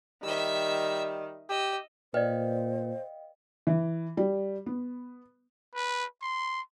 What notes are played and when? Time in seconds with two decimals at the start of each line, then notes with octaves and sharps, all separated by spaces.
0.23 D#3 G3 E5 E6
1.49 G4 D#5 E6
2.14 A#2 B4 C5 D5 D#5 F5 G5
3.67 E3
4.17 G3
4.66 B3
5.75 B4
6.22 C6